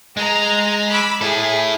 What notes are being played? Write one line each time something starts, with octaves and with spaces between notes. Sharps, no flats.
G#3 A#5
B5 D6 E6
E4 G#4 A4